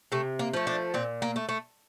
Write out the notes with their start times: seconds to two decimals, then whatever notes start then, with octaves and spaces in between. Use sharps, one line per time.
0.12 C3 A3
0.39 A#3
0.54 F3 A3
0.67 D4
0.94 A#2 C4
1.22 A#3
1.36 A3
1.49 A3